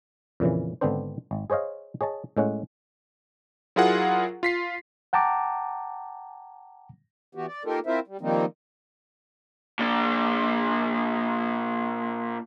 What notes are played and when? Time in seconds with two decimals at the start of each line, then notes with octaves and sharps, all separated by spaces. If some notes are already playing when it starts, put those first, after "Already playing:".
0.40 F2 A#2 C#3 E3
0.81 G#1 D3 B3 C4 D4 C5
1.31 G#1
1.50 G#4 C5 C#5 D#5 F5
2.01 G#4 C#5 D#5 A5
2.37 A2 G#3 C#4 F#5
3.76 F#3 E4 F4 G#4 A#4 F#5
4.43 F4 B6 C7
5.13 F#5 G5 A5 A#5 D6
7.35 E3 B3 F#4 G4
7.47 D5
7.65 A#3 D#4 F4 G4 A4 A#4
7.86 C4 E4 F4 A#4 C5 E5
8.07 G3
8.21 D#3 F3 G3 A#3 C4 D#4
9.79 A#2 D4